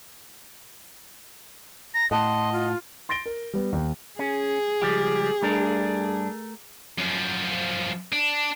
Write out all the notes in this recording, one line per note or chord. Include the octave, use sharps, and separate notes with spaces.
A#5 A#6
A2 D#5 F#5 G5 A5 C6
F4
C6 A6 A#6 D7 G7
A#4
G3 B3
D#2
C#4 G#4
C#2 F3 G3 G4
G2 A3 D4 A#4
F#2 F3
D4